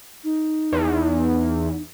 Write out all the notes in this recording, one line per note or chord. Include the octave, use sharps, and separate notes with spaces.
D#4
E2